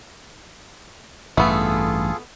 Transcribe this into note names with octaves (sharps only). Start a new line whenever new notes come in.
A1 G2 A3 B3 F4 G#4 A4